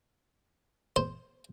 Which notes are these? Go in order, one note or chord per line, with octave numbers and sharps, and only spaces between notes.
C5